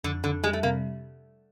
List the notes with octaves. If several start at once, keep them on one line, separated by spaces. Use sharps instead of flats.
F2 D3
F2 D3
G3 G#3
A3
C3 A#3